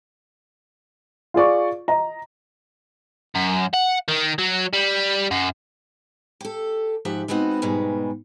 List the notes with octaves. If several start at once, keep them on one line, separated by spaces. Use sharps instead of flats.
F4 G#4 D5 C#6
D#5 A#5
F#2
F#5
D#3
F#3
G3
F#2
G4 A4
G#2 F3 G4 E5 F#5
G#3 B3 C4 D#4 F#4
G#2 B2 G3 G#3